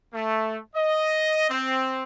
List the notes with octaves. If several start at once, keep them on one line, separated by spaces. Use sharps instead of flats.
A3
D#5
C4